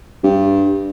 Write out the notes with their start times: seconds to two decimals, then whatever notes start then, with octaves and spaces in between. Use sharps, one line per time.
0.24 G2